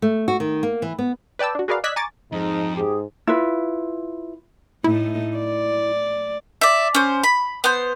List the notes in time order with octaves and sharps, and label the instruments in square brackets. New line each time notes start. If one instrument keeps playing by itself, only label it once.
[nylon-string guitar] A3
F#4
D#3
A#3
E3
B3
[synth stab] B4 D5 G5 A5 E6
D4 F#4
F#4 G#4 A#4 B4 D5 F5
D5 D#5 E6 F#6 G#6 B6
G#5 A#5 C#6 D6 A6
[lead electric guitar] F2 [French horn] G#2 [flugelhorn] D#4
[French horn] G#2 [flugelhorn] G4 [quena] G#4
[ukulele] E4 F4 B4
[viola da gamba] A2 A3 D#4 [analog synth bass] E4
[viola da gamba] D5
[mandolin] D5 E5
C#4 C5
B5
B3 C5